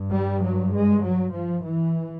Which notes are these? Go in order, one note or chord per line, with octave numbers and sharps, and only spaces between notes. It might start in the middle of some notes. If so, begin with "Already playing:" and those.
Already playing: G2
G3
F#3
G#3
F#3
F3
E3